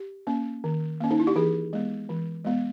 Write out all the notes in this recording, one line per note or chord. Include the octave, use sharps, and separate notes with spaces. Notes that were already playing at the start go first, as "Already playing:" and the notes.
Already playing: G4
A#3 C#4
D#3
A#3 C#4
D#4
E4
G4
E3 G#4
G#3 B3
E3
G#3 B3